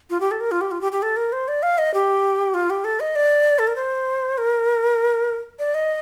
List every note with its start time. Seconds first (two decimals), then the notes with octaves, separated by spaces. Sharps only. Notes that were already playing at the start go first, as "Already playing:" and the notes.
0.10 F4
0.20 G4
0.31 A4
0.41 A#4
0.51 F4
0.61 G4
0.71 F4
0.81 G4
0.92 G4
1.02 A4
1.17 A#4
1.32 C5
1.48 D5
1.63 F5
1.78 D#5
1.94 G4
2.54 F4
2.70 G4
2.84 A4
3.00 D#5
3.16 D5
3.59 A4
3.67 A#4
3.76 C5
4.38 A#4
5.59 D5
5.74 D#5